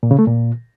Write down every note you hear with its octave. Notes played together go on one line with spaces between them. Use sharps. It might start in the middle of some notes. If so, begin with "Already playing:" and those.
A#2
C#3
A3
A#2